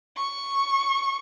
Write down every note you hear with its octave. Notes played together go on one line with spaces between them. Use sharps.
C#6